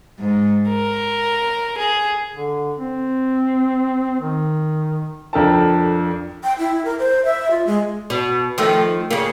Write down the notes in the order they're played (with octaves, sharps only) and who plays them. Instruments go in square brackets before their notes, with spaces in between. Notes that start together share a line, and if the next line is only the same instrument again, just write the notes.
[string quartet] G#2
A#4
G#4
[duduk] D3
C4
D#3
[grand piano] F2 D4 A4 A#4 G5 A5
[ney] G5
E4
A#4
C5
E5
F4
G#3
[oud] B2
D#3 F3 A3
C#3 A#3